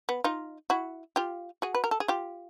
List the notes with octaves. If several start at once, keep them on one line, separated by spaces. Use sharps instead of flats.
B3
D#4 F4
E4 F#4
F4 G4
F#4 G#4
B4
A#4
A4
G#4
F4 G4